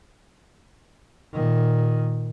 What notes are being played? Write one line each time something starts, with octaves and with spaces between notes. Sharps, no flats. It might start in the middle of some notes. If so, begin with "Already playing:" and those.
A#2 D#3